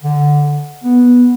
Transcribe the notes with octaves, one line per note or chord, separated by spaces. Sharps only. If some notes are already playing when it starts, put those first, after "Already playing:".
D3
B3